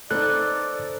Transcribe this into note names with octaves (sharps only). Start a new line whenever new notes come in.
C4 D#4 A4 B4 D5 F#6